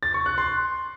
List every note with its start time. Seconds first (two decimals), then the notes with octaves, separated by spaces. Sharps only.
0.03 A6
0.14 C#6
0.26 F#6
0.38 C6